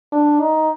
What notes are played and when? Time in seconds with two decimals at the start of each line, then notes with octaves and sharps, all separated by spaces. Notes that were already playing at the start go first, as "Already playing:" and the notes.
0.12 D4
0.40 D#4